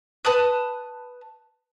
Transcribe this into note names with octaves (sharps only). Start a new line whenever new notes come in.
B4 A5 D#6 F#6